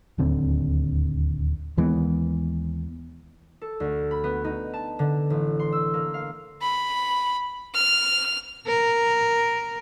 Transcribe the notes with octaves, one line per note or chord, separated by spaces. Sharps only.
D1 D#2 D3 C4
D#2 E3 G#3 B3
A4
D2
B5
B3
D#4
A5
D3
A1
C6
E6
A#3
F5
B5
F6
A#4